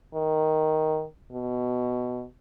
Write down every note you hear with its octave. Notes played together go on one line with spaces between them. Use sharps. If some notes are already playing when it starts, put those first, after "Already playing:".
D#3
B2